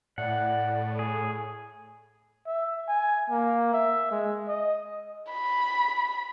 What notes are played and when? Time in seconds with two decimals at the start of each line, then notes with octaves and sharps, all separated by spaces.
0.18 A2 D5 F#5
0.99 G#4
2.46 E5
2.88 G#5
3.30 A#3
3.73 E5
4.11 G#3
4.48 D#5
5.31 B5